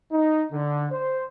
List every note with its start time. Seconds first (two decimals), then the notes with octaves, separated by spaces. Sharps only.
0.12 D#4
0.51 D3
0.91 C5